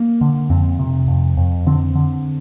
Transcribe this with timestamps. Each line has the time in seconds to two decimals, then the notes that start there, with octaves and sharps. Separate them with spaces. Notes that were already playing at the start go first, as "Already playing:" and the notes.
Already playing: A#3
0.21 D3
0.50 F2 C4
0.79 C3
1.08 F2
1.37 F2
1.67 D3 C4
1.95 D3